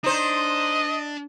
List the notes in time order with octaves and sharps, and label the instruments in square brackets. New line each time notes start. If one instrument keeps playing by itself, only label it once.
[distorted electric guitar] D4 [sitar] D#4 C5 [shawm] D#5